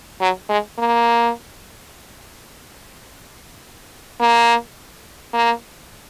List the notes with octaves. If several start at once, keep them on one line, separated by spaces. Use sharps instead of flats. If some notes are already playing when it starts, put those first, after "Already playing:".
F#3
G#3
A#3
A#3
A#3